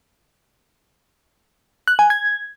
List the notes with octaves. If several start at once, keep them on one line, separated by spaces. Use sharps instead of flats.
F#6
G#5
G#6